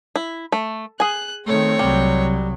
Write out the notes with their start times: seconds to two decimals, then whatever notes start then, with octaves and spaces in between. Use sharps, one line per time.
0.16 E4
0.52 A3
1.00 G#4 G#5 F#6
1.46 D#3 A3 C4 C#5
1.79 C2 F#3 G3